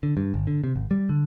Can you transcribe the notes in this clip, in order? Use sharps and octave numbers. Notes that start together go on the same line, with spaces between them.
D3
G2
G1
D3
C3
G#1
G3
D3